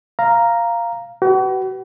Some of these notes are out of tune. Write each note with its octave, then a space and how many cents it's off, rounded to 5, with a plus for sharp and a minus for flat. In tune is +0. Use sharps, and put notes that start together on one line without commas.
F5 -10 A#5 +0
F#4 +40 B4 +10